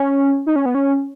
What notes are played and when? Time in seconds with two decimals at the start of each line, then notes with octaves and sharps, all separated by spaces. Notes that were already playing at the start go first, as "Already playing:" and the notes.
Already playing: C#4
0.46 D#4
0.56 C#4
0.66 B3
0.75 C#4